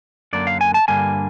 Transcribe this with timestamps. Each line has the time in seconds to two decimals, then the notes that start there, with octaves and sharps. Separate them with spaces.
0.33 F#2 D3 F#3 A#3 D5
0.47 F5
0.61 G#5
0.74 A5
0.88 G2 D3 G3 A#3 G#5